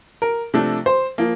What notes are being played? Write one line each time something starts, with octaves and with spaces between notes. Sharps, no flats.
A#4
C3 F3 A3 D4
C5
F3 A#3